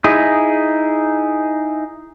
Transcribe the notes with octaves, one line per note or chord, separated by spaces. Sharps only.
D#4 E4 G#4